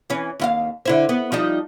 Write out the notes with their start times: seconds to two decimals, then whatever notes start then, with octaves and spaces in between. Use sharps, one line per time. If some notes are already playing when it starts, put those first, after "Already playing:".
0.10 E3 C#4
0.40 D#2 E4 F5
0.85 D3 E4 C5
1.09 B3
1.32 F3 G3 D#4